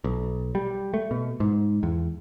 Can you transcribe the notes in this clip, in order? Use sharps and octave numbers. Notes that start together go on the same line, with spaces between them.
B1
G3
A3
B2
G#2
E2